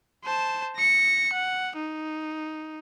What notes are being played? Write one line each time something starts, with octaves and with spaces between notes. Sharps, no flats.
C5 A5
A#6 C#7
F#5
D#4